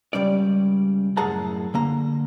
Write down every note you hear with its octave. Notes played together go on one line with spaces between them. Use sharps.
C#2 C3 G3 C#4 D5
F#2 A2 G#4 F#5 A5 A#5
D3 A#3 A#5